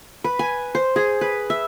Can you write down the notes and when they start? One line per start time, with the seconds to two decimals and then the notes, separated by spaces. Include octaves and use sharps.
0.24 B4
0.39 G#5
0.75 C5
0.96 G#4
1.21 B4
1.50 E5